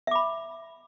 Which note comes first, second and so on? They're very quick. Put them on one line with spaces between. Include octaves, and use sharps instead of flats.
E5 D6 B5